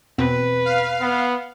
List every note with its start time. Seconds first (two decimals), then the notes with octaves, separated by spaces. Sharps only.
0.18 E2 B2 C4 B4
0.65 F5
1.01 B3